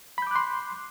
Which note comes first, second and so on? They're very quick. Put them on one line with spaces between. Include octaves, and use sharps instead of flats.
B5 G6 D6 F#6 C6